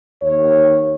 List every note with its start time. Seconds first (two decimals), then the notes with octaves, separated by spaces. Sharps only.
0.22 D#2 C#5